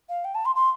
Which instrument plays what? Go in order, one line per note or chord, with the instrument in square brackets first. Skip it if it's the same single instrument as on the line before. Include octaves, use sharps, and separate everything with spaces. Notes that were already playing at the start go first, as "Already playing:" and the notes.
[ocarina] F5
G5
A5
C6
C6